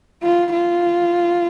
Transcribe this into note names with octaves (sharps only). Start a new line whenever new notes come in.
F4
F4